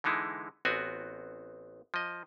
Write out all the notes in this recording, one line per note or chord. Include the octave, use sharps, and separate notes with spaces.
D3 E3 G#3 D#4 E4
A1 B3 C4 F#4 G#5
F3 D#5